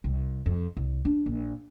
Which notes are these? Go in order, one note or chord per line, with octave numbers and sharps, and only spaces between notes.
C2
F2
C2
D4
A#1